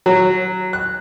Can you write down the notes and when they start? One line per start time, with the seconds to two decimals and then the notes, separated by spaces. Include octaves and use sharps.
0.06 F#3
0.73 F#6